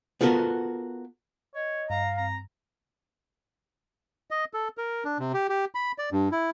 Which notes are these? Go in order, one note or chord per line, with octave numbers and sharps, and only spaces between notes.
B3 F4 F#4 A4 A#4
C#5 D#5
G2 F5 A#5
C4 A#5
D#5
A4
A#4
D4
C3
G4
G4
B5
D5
G2
E4